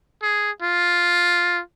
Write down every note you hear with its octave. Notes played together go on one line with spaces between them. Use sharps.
G#4
F4